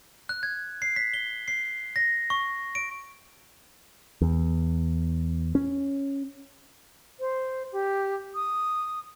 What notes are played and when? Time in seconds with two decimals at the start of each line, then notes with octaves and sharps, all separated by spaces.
0.29 F#6
0.43 G#6
0.82 C7
0.96 B6
1.14 G7
1.48 C7
1.96 A#6
2.30 C#6
2.75 D7
4.21 E2
5.55 C#4
7.20 C5
7.73 G4
8.35 D#6